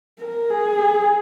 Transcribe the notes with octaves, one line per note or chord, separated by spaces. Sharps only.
A#4
G#4